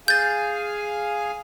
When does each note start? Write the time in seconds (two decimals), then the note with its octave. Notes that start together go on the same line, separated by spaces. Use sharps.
0.08 G#4 F5 G#5 G6 A6